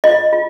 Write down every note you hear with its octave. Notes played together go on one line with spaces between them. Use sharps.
F4 D#5
F4